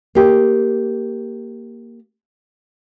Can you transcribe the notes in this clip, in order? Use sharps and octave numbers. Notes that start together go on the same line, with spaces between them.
A#3 G4